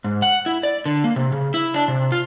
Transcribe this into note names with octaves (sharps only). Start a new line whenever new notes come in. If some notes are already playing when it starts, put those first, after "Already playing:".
G#2
F#5
E4
D5
D3
A#3
C3
C#3
E4
D4
C3
F4